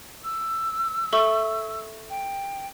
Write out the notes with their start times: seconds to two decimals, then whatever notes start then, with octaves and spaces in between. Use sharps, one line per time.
0.23 E6
1.13 A4 E5 C#6
2.09 G5